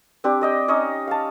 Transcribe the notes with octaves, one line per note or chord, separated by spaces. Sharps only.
C4 D4 G4
D5 D#5 G5
C#4 D#4 C#5 D#5
F5 A5